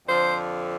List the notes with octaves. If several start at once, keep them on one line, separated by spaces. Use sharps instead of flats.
F2 D3 F3 C5